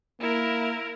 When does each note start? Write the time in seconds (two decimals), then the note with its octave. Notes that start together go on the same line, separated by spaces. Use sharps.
0.20 A#3 E4 A#4